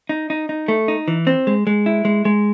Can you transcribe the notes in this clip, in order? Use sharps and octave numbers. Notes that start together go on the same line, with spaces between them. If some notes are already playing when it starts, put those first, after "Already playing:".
D#4
D#4
D#4
A3
D#4
E3
C4
G#3
G#3
E4
G#3
G#3